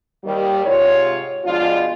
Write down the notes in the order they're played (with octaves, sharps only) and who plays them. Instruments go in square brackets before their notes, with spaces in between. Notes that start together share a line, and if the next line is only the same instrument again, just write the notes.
[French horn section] D#2 D#3 G3
G#2 C3 F4 C#5
B2 F3 G#3 D4 F4